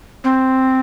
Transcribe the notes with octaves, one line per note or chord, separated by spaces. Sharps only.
C4